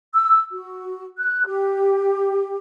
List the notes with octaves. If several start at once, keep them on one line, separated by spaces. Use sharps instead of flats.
E6
F#4
F#6
G4